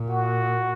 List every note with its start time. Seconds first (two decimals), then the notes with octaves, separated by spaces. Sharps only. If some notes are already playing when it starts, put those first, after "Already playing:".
Already playing: A#2
0.10 F#4